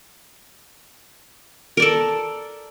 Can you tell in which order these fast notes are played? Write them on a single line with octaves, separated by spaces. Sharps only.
A#4 D5 A4